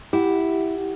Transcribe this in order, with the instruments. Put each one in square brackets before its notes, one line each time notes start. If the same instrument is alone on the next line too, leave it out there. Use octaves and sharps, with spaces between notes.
[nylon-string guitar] E4 [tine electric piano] G4 F#5